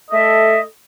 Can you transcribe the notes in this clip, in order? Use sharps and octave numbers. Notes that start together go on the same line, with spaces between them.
A3 A4 D#5 E5